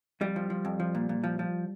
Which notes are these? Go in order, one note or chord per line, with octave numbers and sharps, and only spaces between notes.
F2 G3
F3
F3
F2
F3
A#2
A#2
F3
F3